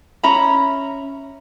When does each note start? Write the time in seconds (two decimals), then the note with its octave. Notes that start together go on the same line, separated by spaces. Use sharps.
0.23 C#4 E5 A#5 B5